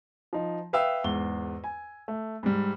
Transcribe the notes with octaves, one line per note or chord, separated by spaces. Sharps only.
F3 D#4
B4 E5 F5 G5 D#6 E6
E2 G#2 G7
G#5
A3
G#2 G3